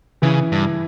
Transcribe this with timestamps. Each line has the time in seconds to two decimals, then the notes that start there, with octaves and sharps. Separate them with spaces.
0.22 C#3 E3 E4
0.52 G2